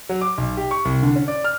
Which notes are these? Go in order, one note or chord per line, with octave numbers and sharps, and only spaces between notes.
F#3
D6
B1
G4
C#6
C2
D3
C#4
D5
F6